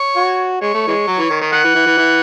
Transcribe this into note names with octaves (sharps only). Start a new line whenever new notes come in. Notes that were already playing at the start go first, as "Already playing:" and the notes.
Already playing: C#5
F#4
G#3 C#5
A3
E3 G#3
F#3
E3
D#3
D#3
D#3 F#5
E3
E3
E3
E3